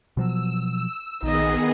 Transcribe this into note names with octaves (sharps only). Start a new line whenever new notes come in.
B2 F3 F#3 E6
A#1 D#3 B3 D#4 G#4 D#5